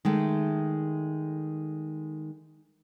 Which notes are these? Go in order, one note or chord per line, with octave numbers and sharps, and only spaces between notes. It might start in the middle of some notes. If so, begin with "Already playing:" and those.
D#3 G#3 A3